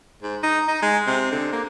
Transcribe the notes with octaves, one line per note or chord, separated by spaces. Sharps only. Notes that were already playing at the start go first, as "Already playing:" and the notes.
G#2
D#4
D#4
G#3
C3
D3
A#3